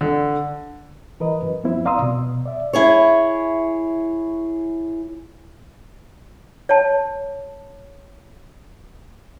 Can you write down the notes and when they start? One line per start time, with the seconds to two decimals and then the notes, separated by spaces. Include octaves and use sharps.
0.01 D3
1.20 E3 A#4 B4 D#5
1.42 F#2
1.64 F3 B3 C4 E4
1.85 D5 F5 A#5 C6 D#6 E6
2.02 B2
2.46 D5 E5
2.73 E4 G#4 C#5
6.69 C#5 A5